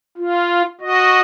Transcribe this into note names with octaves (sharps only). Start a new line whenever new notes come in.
F4
F#4 D#5